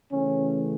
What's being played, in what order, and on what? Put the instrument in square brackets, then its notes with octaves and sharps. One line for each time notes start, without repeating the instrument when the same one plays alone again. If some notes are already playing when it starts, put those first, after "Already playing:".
[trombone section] C#3 E3 A3 C#4